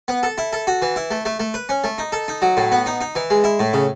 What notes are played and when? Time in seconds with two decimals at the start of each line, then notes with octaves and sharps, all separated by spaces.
0.08 B3
0.23 A4
0.38 E4
0.53 A4
0.67 F#4
0.82 E3
0.96 E4
1.11 A3
1.25 A3
1.40 A3
1.54 B4
1.69 C#4
1.84 A3
1.98 D#4
2.12 A4
2.28 D#4
2.42 F#3
2.57 A2
2.72 B3
2.86 D#4
3.01 D#4
3.15 E3
3.30 G#3
3.44 E4
3.60 A2
3.73 C#3